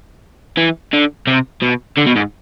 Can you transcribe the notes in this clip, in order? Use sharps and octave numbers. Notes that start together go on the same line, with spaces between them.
E3
D3
C3
B2
D3
B2
G#2